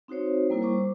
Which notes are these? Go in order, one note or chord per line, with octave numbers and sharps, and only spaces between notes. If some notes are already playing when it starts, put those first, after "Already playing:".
C4 D#4 F#4 C5 C#5
G3 A#3 E4 A#4
G3 C5 C#6 D6